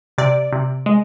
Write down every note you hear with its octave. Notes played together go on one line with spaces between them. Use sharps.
C3 D5
C3
G#3